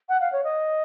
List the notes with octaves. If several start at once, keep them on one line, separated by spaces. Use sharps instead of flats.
F#5
F5
C#5
D#5